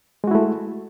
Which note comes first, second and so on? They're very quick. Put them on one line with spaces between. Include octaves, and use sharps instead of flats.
G#3 F#4 E4 A3